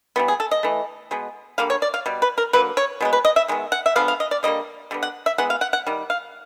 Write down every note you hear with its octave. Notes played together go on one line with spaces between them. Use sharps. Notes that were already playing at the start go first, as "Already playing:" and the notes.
E3 G3 B3
G#4
A4
D#5
E3 A3
B2 G#3 B3
D3 G3 A#3 F5
C#5
D5
F5
B2 G3
B4
A#4
D3 F#3 A#3 B4
C#5
B2 G#3 B3
B4
D#5
E5
D#3 G#3 B3
F#5
E5
D3 F3 G#3 B3 F5
F5
D#5
D5
D3 G3 A#3 D#5
D3 G3 B3
F#5
E5
E3 G#3 B3 F#5
F5
F#5
F#5
D#3 G3
F5